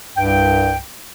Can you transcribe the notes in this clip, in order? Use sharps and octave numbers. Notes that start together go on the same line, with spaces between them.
C2 G2 G5